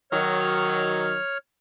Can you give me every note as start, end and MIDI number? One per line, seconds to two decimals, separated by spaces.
0.12 1.16 51
0.12 1.16 54
0.12 1.38 73
0.12 1.38 89